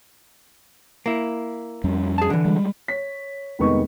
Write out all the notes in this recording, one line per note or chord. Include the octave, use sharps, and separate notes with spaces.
A#3 E4
F2 G3 C#4
G#4 A5
D3 E3
G3 G#3
C#5 B6
F1 D#3 G#3 B3 D#4 C#6